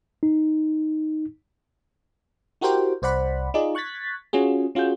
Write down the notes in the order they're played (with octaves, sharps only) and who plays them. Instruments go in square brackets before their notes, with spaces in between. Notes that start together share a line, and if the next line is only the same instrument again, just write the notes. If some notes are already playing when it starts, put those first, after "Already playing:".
[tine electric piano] D#4
[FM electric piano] E4 F#4 G4 A#4 C5 G5
C2 C5 D5 F#5 B5
D#4 F4 G#4 D5 D#5
C#6 F#6 G#6 A6 B6
C#4 F4 F#4 G#4
C#4 F4 F#4 G#4 G6